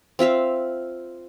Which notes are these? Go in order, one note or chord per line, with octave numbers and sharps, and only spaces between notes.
C4 F4 E5 F5